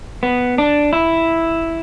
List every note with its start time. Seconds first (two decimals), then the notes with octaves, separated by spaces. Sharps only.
0.23 B3
0.58 D4
0.93 E4